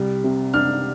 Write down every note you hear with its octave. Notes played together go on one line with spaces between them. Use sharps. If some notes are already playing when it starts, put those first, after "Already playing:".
Already playing: C2 G3
C3
D4 F6